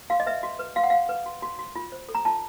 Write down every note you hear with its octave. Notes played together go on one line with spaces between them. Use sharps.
F#4 F5
D#5
B4 E5
F#4
B4
F#4 F5
F#5
F#4 F5
B4
F#4
F#4
F#4
F4
C5
A4
A#5
F4 A5